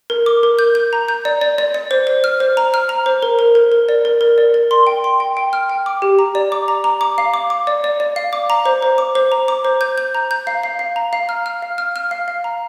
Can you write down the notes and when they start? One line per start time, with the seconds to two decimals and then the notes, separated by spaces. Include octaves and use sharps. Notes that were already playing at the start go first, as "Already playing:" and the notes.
0.10 A#4
0.26 D6
0.43 A#4
0.59 G6
0.75 G6
0.93 A#5
1.08 G6
1.25 D5
1.41 D5
1.58 D5
1.74 D5
1.91 C5
2.07 C5
2.24 F6
2.40 C5
2.57 A#5
2.74 F6
2.89 A#5
3.06 C5
3.23 A#4
3.39 A#4
3.55 A#4
3.72 A#4
3.89 D5
4.05 A#4
4.21 A#4
4.38 D5
4.54 A#4
4.71 C6
4.87 G5
5.04 C6
5.20 G5
5.37 G5
5.53 F6
5.70 G5
5.86 D6
6.02 G4
6.19 A#5
6.35 D5
6.52 D6
6.68 A#5
6.84 A#5
7.01 D6
7.18 F5
7.34 D6
7.50 D6
7.67 D5
7.84 D5
8.00 D5
8.16 F5
8.33 D6
8.50 A#5
8.66 C5
8.82 C5
8.98 D6
9.15 C5
9.32 A#5
9.48 D6
9.65 C5
9.81 G6
9.98 G6
10.15 A#5
10.31 G6
10.47 F5
10.63 F5
10.79 F5
10.96 A#5
11.13 F5
11.29 F6
11.46 F6
11.62 F5
11.78 F6
11.96 F6
12.11 F5
12.28 F5
12.44 A#5